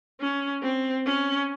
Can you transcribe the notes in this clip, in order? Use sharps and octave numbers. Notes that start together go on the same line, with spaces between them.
C#4
C4
C#4